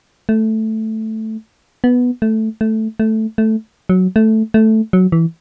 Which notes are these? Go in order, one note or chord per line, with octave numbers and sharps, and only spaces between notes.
A3
B3
A3
A3
A3
A3
F#3
A3
A3
F#3
E3